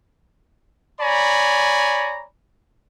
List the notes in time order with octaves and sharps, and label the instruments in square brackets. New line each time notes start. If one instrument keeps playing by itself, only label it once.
[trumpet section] C#5 D5 G#5 A#5 B5